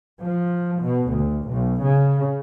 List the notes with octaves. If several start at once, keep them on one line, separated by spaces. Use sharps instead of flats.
F3
B2
D2
B1
C#3